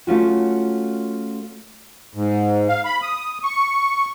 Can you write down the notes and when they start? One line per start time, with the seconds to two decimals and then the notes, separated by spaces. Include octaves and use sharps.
0.07 A3 C#4 F4 F#4
2.14 G#2
2.69 F5
2.85 B5
3.02 D#6
3.44 C#6